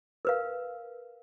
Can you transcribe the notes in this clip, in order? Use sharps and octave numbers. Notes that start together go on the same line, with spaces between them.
A#4 B4 F5